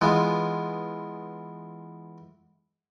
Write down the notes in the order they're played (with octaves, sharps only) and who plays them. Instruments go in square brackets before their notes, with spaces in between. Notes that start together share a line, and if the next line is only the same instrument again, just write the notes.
[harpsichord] E3 G#3 B3 F4